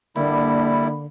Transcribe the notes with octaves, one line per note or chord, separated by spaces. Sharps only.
D3 G3 A#3 E4 B5